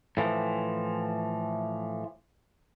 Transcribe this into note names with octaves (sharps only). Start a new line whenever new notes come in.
A2 E3 F3